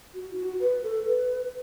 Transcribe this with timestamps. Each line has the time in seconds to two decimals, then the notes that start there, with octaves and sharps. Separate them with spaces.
0.15 F#4
0.33 E4
0.37 F#4
0.60 B4
0.83 A4
1.06 B4